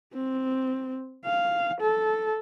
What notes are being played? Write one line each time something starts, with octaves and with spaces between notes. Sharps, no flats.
C4
F5
A4